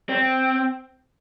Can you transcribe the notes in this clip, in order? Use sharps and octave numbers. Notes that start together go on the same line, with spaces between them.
C4